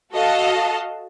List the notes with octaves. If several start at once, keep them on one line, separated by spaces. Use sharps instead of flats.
F#4 A4 D#5 F5 A5